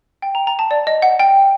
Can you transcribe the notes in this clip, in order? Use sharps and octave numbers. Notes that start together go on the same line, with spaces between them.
G5
A#5
A#5
A5
D5
D#5
F#5
G5